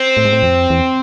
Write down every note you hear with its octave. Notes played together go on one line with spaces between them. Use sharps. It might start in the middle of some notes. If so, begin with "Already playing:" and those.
Already playing: C4
A2
G#2
A2
F2
E2